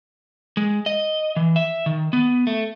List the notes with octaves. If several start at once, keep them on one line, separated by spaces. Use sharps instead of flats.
G#3
D#5
E3
E5
D#3
B3
A3